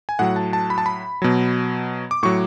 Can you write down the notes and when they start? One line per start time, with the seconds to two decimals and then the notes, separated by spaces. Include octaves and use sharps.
0.09 G#5
0.19 A2 F#3 F#5
0.36 A5
0.53 A5
0.70 B5
0.78 A5
0.86 B5
1.22 B2 F#3
2.11 D6
2.23 A2 F#3 C#6